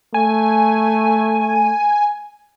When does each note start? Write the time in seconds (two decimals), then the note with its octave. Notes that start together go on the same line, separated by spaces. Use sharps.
0.14 A3 G#5